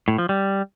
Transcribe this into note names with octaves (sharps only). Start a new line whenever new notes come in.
A2
F3
G3